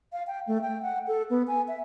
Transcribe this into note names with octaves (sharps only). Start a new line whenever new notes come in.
F5
G5
A3
G5
F#5
A4
B3
G#5
E5